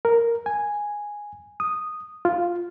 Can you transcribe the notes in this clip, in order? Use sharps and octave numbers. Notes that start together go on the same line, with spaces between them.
A#4
G#5
D#6
F4